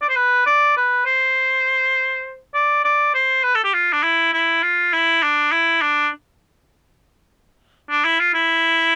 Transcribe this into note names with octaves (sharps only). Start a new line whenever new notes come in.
D5
C5
B4
D5
B4
C5
D5
D5
C5
B4
A4
G4
F4
D4
E4
E4
F4
E4
D4
E4
D4
D4
E4
F4
E4